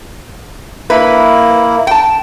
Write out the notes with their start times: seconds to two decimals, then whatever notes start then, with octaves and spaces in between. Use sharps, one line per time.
0.90 A#3 E4 B4
1.87 G5 A5